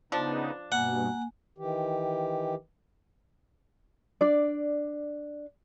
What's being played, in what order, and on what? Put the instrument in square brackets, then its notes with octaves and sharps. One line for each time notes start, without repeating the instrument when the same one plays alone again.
[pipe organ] C#3 B3 D#4 [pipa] F3 D4
[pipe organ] G2 B2 [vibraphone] A#3 G#5 [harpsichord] F#5
[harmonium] D#3 E3 G4
[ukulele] D4 D5